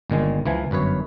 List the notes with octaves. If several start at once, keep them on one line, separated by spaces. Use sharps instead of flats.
G1 A#2 D#3 G#3
C#2 E3 F3 G#5
G1 F#2 B4 C#5